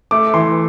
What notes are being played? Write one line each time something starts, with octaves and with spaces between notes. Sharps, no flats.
A3 D6
E3 C6